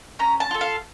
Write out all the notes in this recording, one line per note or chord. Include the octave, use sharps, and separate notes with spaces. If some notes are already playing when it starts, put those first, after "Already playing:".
C#4 A#5
A5
F4 A4
F5